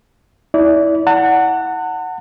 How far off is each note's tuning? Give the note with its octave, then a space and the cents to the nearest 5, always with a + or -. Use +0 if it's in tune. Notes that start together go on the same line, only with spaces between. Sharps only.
E4 -20 D5 -30
F#5 +0 A5 +45